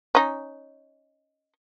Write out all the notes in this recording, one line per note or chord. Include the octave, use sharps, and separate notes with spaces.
C#4 D#4